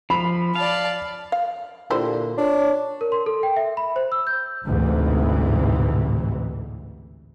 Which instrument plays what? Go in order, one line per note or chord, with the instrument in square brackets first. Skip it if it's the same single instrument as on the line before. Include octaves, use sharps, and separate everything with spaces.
[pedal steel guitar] F3 [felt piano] B5
[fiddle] D5 A5 [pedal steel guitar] F5
[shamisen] F5
[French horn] A#2 [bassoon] D3 [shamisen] E4 G4 C5
[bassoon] D4 [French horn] C#5
[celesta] A#4
C6
A4
G5
E5
B5
C5
E6
G6
[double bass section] A1 D2 G#2 C3 E3